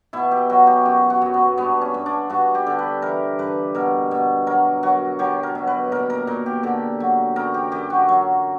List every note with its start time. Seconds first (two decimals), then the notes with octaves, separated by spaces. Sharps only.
0.13 B2 E4
0.31 G4
0.50 F#3 F#4
0.67 G4
0.86 F#2 F#4
1.10 F#4
1.22 F#2
1.34 B3
1.58 G2 B3
1.81 C#4
1.94 G2
2.06 D4
2.30 G2 F#4
2.55 G4
2.67 D3
2.79 B4
3.02 E3 A#4
3.39 G2 B4
3.75 B2 A#4
4.11 B2
4.47 F#3 A#4
4.83 F#3 F#4
5.19 F#3 G4
5.43 A#4
5.55 B2
5.67 B4
5.92 A#2 A#4
6.10 A#4
6.27 A#2 A#4
6.46 G4
6.63 D3 G4
7.00 F#3
7.36 F#2 A#4
7.54 G4
7.72 F#2 G4
7.90 F#4
8.09 F#3